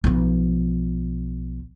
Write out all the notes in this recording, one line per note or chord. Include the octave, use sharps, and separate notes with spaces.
B1 F3